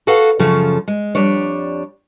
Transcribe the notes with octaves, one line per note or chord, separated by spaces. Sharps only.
F#4 A4 B4 F5 F#5
F#2 C#3 F3 A4
G#3
F2 G3 D4 C#5